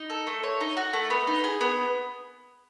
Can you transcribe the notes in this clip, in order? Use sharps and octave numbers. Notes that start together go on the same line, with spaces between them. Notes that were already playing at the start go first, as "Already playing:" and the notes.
Already playing: D#4
A4
A3
C#5
D#4
F#4
A3
B3
D#4
G#4
B3